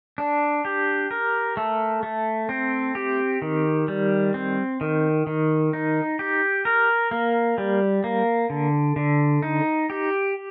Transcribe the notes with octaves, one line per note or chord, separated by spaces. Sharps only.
D4
G4
A#4
A3
A3
C4
G4
D#3
G3
C4
D#3
D#3
D#4
G4
A#4
A#3
G3
A#3
D3
D3
D#4
G4